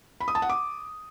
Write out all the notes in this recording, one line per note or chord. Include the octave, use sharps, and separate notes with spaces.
B5
D#6
A5
F#5
D6